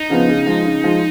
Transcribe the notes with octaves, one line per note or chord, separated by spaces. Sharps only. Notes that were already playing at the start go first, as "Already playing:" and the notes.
Already playing: D#4
C#3 F3 B3
C#3
F3 G#3
C#3
F3 G#3